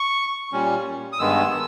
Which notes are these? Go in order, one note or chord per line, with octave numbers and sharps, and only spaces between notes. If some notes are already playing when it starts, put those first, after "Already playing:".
Already playing: C#6
A#2 G3 C#4
D#6
G2 D#3 G#3 B3 E6